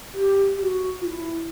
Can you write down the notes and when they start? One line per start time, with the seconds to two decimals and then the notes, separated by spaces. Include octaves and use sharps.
0.13 G4
0.58 G4
0.63 F#4
1.01 F4
1.06 E4